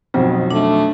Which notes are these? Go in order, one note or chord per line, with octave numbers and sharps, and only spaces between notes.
B1 F2 B2 C4
A3 D4